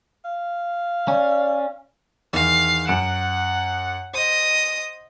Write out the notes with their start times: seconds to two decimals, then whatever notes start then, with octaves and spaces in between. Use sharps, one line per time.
0.25 F5
1.08 C#4 D5
2.33 E2 D#3 F5
2.87 F#2 F#5 D7 E7
4.14 C5 D#5 D#6